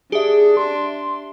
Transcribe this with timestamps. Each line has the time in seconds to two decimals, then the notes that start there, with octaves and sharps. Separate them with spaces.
0.12 D4 G4 G#4 E5
0.57 C6